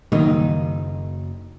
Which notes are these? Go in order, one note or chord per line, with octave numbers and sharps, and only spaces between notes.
F#1 A#2 D#3 F#3 G3 A#3 D#4